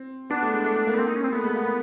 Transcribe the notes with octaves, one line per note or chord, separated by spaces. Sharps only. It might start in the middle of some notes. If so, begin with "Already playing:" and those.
Already playing: C4
B3 D4
A3
G#3
A3
A3
A#3
B3
A#3 C4
D#4
C#4
C4
A3 B3
G#3
A#3
A#3